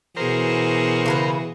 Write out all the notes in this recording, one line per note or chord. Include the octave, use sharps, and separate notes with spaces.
B2 E3 F#4 G#4 A#4 C5
C#3 A4 B4